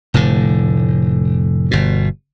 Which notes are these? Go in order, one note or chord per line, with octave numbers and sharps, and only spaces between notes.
F1 A2 D3
G1 B2